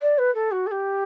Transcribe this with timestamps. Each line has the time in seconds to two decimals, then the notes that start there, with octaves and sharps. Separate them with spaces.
0.02 D5
0.18 B4
0.34 A4
0.51 F#4
0.66 A4
0.71 G4